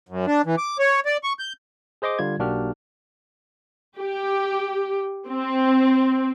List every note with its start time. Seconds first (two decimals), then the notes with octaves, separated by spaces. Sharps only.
0.09 F#2
0.27 D4
0.46 E3
0.58 D6
0.79 C#5
1.06 D5
1.24 C#6
1.39 G6
2.02 G#4 C5 D#5 C6 D6
2.19 D3 G3 F4 G#6
2.39 B1 A#3 D4 F#4 G4 F6
3.98 G4
5.28 C4